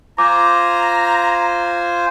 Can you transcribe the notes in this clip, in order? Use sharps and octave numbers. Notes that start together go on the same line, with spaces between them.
F4 C5 G#5 A#5 D6